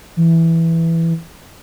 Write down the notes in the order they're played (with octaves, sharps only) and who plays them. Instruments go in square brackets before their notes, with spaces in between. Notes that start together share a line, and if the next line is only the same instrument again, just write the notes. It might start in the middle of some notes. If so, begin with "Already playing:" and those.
[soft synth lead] E3